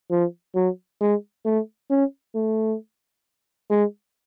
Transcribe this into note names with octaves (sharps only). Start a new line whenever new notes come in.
F3
F#3
G#3
A3
C#4
A3
G#3